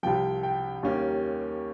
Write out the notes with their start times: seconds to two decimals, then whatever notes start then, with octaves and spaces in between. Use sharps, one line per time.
0.03 C2 C3 F3 G5
0.43 G5
0.83 D#2 D#3 G3 A#3 C#4